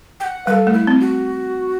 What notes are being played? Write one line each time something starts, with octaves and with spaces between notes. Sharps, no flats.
G5
F#5
G3 A4 B4
A3
E4
C4
F#4